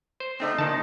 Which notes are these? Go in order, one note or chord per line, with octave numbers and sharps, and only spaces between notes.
C5
D3 A3 C4 D#4
A#2 D3 D#3 A5